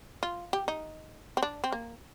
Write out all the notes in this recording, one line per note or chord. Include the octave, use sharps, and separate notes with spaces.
F4
G4
D#4
C4
D4
C4
A#3